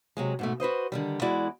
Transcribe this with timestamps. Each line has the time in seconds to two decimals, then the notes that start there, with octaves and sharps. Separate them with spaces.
0.17 C3 F#3 G#3
0.39 G#2 B2 A3
0.60 F#4 B4 C5 D#5
0.92 D3 D#3 G3
1.22 E2 G#3 E4 F#4 D5